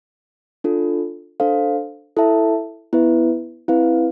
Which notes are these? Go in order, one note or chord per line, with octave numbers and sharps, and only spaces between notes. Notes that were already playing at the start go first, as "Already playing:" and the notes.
D4 F4 A4
D4 A4 C5 F5
E4 A4 E5 A5
B3 E4 B4 E5
C4 E4 B4 F5